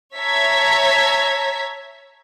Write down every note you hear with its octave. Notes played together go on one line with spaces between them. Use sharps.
C#5 E5 A5 A#5 G#6 B6